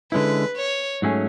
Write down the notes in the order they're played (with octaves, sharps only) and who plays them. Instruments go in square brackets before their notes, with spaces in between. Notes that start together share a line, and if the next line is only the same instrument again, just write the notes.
[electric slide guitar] D3 G#3 C#4 E4 [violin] B4
[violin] C#5
[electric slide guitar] G#2 F#3 A3 C#4 G#4